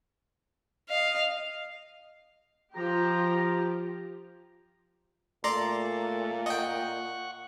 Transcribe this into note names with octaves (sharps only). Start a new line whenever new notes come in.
D#5 F5
F3 G4 A#5
A#2 A3 A4 D5 A#5 C6
D#5 F#5 G5 C#6